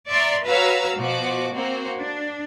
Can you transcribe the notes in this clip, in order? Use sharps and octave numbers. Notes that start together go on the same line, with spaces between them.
D5 E5 A#5 C6 C#6
F#4 B4 C#5 F5 A#5 E6
B2 F3 F#4 D6
A#3 C4 F#4 C5
D4